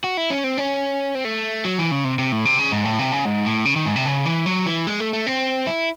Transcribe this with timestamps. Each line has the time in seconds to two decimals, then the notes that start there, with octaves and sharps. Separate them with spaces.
0.04 F#4
0.17 E4
0.30 C#4
0.44 C4
0.58 C#4
1.15 C4
1.25 A3
1.65 F#3
1.78 E3
1.91 C#3
2.04 C3
2.19 C3
2.32 A2
2.45 C3
2.59 C#3
2.72 G#2
2.85 A2
2.99 C3
3.12 C#3
3.25 G#2
3.46 A2
3.65 C#3
3.76 D#3
3.86 G#2
3.96 C3
4.06 C#3
4.25 E3
4.46 F#3
4.66 E3
4.87 G#3
5.00 A3
5.13 A3
5.27 C4
5.67 E4